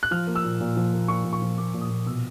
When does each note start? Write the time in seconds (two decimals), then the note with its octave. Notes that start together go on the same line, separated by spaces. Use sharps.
0.03 F#6
0.11 F3 F6
0.27 A#3
0.35 E6
0.44 A#2
0.61 A#2
0.77 F3
0.93 A#3
1.08 A#2 C#6
1.24 A#2
1.33 C#6
1.42 F3
1.58 A#3 D6
1.74 A#2
1.81 D#6
1.90 A#2
2.06 B2 E6